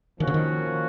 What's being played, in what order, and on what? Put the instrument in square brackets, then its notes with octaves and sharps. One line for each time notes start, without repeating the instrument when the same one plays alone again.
[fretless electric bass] D#3 [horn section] F3 A#3 C#4 F#4
[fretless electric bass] C#3
D#3